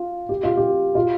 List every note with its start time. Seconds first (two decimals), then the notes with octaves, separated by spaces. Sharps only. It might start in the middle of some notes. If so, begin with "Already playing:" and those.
Already playing: F4
0.29 G4
0.43 F4
0.57 G4
0.95 F4